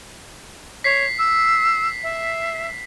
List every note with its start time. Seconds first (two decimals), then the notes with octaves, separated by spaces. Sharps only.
0.84 C#5 B6 C7
1.19 E6
2.03 E5